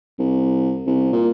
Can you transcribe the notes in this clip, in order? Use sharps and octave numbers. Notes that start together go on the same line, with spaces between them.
C2
C2
A#2